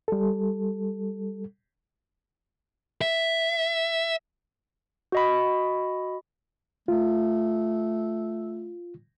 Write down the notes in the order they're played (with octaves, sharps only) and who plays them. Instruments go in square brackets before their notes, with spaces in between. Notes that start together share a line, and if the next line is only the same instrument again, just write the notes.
[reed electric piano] G3 A4
[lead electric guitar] E5
[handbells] F#4 D#5 B5
[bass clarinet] A3 [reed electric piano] F4